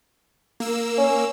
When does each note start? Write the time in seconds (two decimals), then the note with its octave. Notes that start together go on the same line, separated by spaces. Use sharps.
0.60 A#3 E6
0.97 C#4